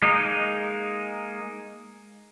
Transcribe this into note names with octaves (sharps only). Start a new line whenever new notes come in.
G#3 A#3 D#4